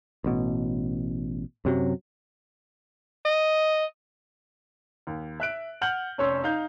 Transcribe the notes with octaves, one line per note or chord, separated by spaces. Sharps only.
A1 B2
F#2 C3 F#3
D#5
D#2
E5 F#6 D7
F#5 F6 G6 F#7
F1 C#4 C#5 C6 E6
D#4 F5 G6